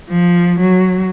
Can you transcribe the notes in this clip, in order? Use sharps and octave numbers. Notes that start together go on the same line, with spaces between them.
F3
F#3